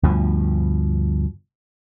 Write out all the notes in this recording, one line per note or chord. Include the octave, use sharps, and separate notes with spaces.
D2 G2 B2 F3